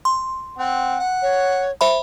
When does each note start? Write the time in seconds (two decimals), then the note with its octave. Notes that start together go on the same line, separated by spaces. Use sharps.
0.05 C6
0.58 C4 F#5
0.99 F#5
1.22 C#5
1.81 C5 E5 B5